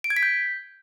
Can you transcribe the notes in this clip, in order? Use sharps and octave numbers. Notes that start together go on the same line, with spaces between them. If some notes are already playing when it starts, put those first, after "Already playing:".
D7
G#6
B6
G6